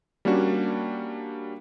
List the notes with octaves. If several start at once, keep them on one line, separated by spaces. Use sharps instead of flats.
G3 A#3 C#4 D4 F#4